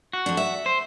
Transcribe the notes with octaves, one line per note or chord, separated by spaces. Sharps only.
F#4
F2 D4
E5
C5